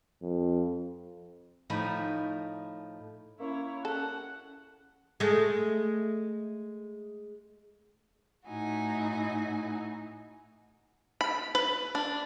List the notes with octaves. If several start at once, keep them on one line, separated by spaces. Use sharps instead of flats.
F2
A2 F3 D#4 G#5 A#5 B5
A#3 C#4 E4 C#5
A4 F#5
G#3 A3
A2 D#4 E4 F#4 G#5
B5
B4
D4